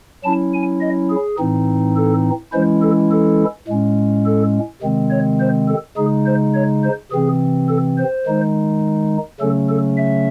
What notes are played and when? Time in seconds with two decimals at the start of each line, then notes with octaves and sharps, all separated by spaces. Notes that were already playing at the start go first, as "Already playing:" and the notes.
0.24 F#3 C#4 E4 A5
0.53 G#5
0.81 D#5
1.10 G#4
1.38 A2 E3 C4 D#4
1.96 A4
2.53 E3 G#3 C#4 E4 C5
2.82 A4
3.11 A4
3.68 A2 G#3 C#4
4.25 A4
4.82 C3 D#3 G#3 C4
5.10 C#5
5.40 C5
5.68 A4
5.97 C#3 G#3 D#4 G#4
6.26 C5
6.54 C#5
6.83 C5
7.11 C3 E3 C4 G#4
7.68 A4
7.98 C5
8.26 D#3 G#3 D#4
9.40 C#3 F#3 A3 C#4 A4
9.69 A4
9.97 E5